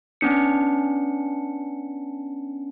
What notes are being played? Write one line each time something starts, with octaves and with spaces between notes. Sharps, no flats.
B3 C#4 D4 C#7